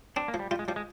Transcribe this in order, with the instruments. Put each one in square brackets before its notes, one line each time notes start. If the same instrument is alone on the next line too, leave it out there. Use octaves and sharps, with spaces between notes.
[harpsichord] C4 [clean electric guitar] D4
[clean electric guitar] A#3
[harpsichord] F3
[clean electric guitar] G3
[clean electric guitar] G3 [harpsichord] F4
[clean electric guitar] G#3
[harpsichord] F3 [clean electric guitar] G3
[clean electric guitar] G#3